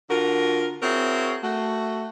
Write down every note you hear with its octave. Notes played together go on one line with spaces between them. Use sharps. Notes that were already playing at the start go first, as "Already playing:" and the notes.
D3 F4 F#4 A#4
C4 E4 F#4 G#4 A#4 C#5
A3 F#4